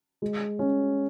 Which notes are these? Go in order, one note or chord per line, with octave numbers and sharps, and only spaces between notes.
G#3
C#4